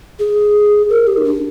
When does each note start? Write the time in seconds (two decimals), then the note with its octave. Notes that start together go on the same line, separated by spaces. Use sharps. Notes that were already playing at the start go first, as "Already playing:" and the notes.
0.19 G#4
0.89 A#4
1.07 G4
1.17 D#4
1.25 D4